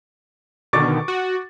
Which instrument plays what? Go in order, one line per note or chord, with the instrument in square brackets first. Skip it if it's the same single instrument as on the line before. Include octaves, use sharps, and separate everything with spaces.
[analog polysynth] B2 D3 D#3 [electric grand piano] C#6 D6 A6
[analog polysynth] F#4